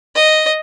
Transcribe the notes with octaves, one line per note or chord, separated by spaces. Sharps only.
D#5